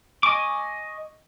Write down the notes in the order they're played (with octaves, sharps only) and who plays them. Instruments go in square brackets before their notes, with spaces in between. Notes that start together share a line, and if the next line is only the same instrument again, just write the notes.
[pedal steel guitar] D#5 G#5 C#6 D6